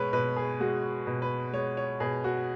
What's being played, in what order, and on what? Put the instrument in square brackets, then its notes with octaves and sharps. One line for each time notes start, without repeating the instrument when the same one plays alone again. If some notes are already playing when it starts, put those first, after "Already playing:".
Already playing: [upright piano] B2 G#3 B4 C#5
B2 B4
G#4
G#3 F#4
B2
B4
G#3 C#5
C#5
B2 G#4
F#4